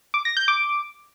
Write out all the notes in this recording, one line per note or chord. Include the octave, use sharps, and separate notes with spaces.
D6
A#6
G6
D6